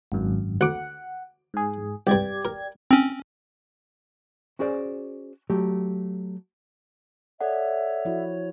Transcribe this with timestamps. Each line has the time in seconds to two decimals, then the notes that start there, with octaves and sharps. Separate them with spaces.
0.12 G#1 F#2
0.61 D2 F#5 D6
1.54 G#2 G#4
2.07 C2 G2 G4 D5 G#6
2.45 A#4
2.91 C4 C#4
4.59 C#4 F#4 G#4 C5 D5
5.50 F#3 A3 G4
7.41 A4 C#5 D5 E5 F#5
8.05 F3 E4 F#4